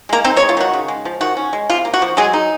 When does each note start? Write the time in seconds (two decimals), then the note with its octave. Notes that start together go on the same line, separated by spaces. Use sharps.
0.09 G#3 A#3 A#4
0.24 C4 D#4 C5
0.36 C#4 C#5
0.40 G#3
0.49 F4
0.57 D#3 F#4
0.73 C#3
0.88 G#3
1.05 F3
1.21 D#3 F#4
1.37 C#4
1.53 G#3
1.70 C3 F4
1.85 A#3
1.94 F#4
2.02 F3
2.17 F#3 G#3 G#4
2.33 D#4